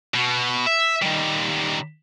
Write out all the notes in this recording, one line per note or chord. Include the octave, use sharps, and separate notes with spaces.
B2
E5
D#3 G3